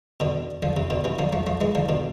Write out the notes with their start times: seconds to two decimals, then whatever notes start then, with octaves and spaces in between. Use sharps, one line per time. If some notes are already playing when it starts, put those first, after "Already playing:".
0.20 B2 D3
0.63 D3 F3
0.77 C3
0.90 B2 D3
1.04 C3 E3
1.19 D3 F3
1.33 F3 A3
1.47 F3 A3
1.61 E3 G#3
1.75 D3 F3
1.89 B2 D3